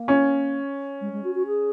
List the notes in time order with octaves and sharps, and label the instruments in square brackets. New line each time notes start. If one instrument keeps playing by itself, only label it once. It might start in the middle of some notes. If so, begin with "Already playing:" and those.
Already playing: [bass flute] A#3
[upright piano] C#4
[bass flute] G#3
G#3
F#4
F#4
G#4